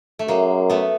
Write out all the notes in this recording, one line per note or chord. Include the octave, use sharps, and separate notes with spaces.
A3
F#2 G#3 A#3
A3 B3